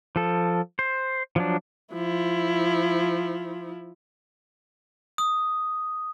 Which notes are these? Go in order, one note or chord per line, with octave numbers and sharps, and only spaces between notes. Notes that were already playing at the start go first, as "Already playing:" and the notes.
F3 A4
C5
F3 F#3 D4
F3 E4
D#6